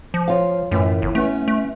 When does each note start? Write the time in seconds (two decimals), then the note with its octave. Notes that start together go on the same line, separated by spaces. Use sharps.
0.14 F3
0.28 F4 C#5 F5
0.71 F#2 A2 E3 F4
1.02 G1
1.15 A3 B3 C#4
1.48 A3